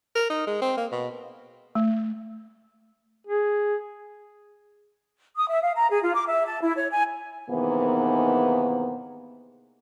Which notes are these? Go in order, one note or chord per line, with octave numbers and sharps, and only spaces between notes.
A#4
D#4
G#3
C4
A#3
B2
A3
G#4
D#6
E5
F5
A#5
G#4
F4
D6
E5
A5
E4
C#5
G#5
G#2 C3 D#3 E3 A#3 B3